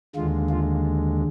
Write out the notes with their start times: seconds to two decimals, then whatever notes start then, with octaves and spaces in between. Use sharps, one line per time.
0.16 D#2 D3 G#3 F4
0.49 F4